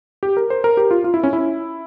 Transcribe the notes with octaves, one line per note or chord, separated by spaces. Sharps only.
G4
A#4
C5
A#4
G4
F4
F4
E4
C#4
E4